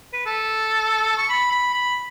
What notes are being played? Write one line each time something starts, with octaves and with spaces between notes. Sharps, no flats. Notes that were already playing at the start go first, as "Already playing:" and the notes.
B4
A4
C#6
B5
B5
B5